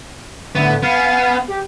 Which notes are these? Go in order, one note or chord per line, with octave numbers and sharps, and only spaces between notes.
A2 D3 A3 B3
B3 F5 G#5
G4